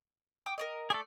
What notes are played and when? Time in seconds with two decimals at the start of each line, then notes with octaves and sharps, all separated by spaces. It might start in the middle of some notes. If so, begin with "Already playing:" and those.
0.46 G5 D6 D#6
0.58 A#4 D5 D#5
0.90 A3 G#4 A4 D5